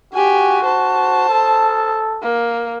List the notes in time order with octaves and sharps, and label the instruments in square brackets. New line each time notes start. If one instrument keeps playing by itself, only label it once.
[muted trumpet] F#4 [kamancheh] G4 G#5
[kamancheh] C5 A5
[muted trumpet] A4
[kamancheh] A#3